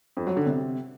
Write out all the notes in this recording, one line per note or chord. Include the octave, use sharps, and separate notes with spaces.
F2
F#3
D3
C3